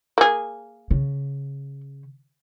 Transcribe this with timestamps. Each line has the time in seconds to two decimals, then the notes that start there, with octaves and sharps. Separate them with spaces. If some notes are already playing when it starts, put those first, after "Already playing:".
0.18 A#3 G#4
0.91 C#3